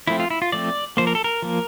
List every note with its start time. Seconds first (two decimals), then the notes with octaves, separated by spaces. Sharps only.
0.07 F3 A3 C4 E4
0.20 F4
0.30 E4
0.42 F4
0.52 F3 A3 C4 D5
0.97 F3 A#3 C5
1.07 A#4
1.15 A4
1.24 A#4
1.42 F3 A#3